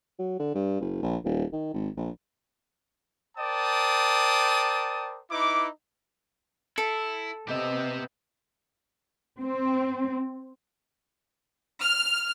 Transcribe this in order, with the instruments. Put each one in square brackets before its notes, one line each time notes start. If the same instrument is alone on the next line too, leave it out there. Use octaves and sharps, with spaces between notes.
[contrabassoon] F#3
D3
G2
F#1
A#1
D#1
D#3
G#1
A#1
[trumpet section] A#4 C5 D5 G5 A5 D#6
D#4 E4 B4 D6
[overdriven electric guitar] E4 [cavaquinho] A4
[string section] C3 B3 [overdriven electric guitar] G4 E5 [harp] B4 D#5 A5
[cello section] C4
[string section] F6